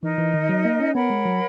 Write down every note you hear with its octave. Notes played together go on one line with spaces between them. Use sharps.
E3 D#4 A#4 D#5
E3
D#3
F#3
A#3
C#4
B3 A#4 C#5 F#5 B5
G#3
F#3